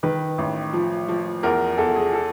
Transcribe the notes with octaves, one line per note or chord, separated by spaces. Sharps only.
D#3 B4
A1
F3
F3
E2 A#4
E2 A4
G#4
A4